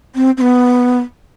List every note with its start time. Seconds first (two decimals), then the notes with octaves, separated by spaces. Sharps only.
0.15 C4
0.37 C4
0.41 B3